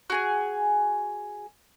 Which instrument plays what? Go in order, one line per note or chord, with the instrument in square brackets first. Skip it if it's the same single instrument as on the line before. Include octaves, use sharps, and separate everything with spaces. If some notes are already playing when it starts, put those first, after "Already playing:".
[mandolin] F#4 G#4 G#5